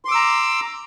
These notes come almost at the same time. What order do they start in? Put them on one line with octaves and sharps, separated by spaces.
C6 D6 E6 A#5